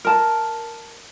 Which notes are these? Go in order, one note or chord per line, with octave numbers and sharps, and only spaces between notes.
A#4 A5